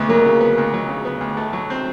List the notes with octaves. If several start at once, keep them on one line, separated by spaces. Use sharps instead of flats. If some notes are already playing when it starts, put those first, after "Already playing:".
Already playing: D2 C#3 B3
F#3 A#3
C#3
B3
D2
F#3
C#3
B3
D2
A3
F#3
C4